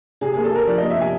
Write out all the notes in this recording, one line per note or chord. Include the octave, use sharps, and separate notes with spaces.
C3 G#4
G#4
A#3
A4
A#3 A#4
F3 D5
D#5
A#3
E5
C3 G#5